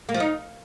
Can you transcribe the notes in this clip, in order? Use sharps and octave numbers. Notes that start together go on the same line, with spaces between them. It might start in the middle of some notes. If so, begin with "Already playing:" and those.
A#3
F3
D#4